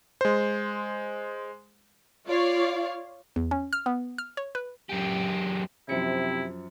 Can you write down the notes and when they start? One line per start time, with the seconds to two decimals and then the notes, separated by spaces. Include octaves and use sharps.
0.21 G#3 C5
2.27 F4 C#5 D5 F5
3.36 E2
3.51 C#4
3.73 F6
3.86 B3
4.18 F6
4.37 C#5
4.55 B4
4.90 F#2 G4
5.89 F#2 C3 F3 E4 C#7